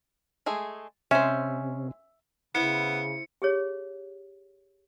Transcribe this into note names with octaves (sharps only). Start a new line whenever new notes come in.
G#3 A3 G#4
C3 G#3 C#4 C5 E5
C#3 B3 E4 C5 C#7
G4 G#4 C#5